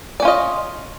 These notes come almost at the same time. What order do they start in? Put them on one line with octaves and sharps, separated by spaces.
D5 C#4 F4 D#5